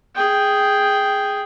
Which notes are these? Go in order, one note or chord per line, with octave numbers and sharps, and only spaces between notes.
G#4 G5